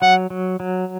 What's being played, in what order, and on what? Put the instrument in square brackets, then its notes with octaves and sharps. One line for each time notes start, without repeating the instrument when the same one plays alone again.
[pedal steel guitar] F#3 [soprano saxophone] F#5
[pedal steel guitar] F#3
F#3